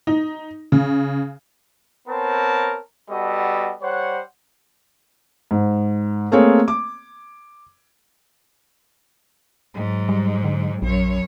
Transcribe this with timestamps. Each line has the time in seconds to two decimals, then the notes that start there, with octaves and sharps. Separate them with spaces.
0.07 D#4
0.72 C#3
2.08 B3 C4 A#4 C#5 A5
3.10 G3 B3 F#4 A4 D#5
3.82 G3 C5 C#5 F#5
5.51 G#2
6.32 A3 A#3 C4 G#4 C#5
6.68 D6
9.75 G#2 F#3
10.09 G3
10.44 D3
10.82 A#1 F#2 C#5